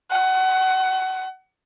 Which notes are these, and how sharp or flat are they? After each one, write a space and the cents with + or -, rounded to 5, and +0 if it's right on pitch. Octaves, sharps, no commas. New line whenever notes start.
F#5 +25